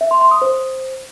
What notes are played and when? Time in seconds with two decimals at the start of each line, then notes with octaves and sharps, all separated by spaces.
0.01 E5
0.11 C6
0.21 C6
0.31 D#6
0.42 C5